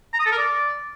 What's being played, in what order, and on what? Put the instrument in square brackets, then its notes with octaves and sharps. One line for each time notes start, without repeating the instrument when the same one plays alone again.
[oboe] A#5
D#6
A4
A#4
D5